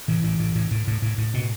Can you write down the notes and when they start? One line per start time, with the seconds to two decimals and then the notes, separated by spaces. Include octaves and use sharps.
0.08 A2 E3
0.24 A2
0.39 A2
0.55 A2
0.71 A2
0.87 A2
1.02 A2
1.18 A2
1.34 B2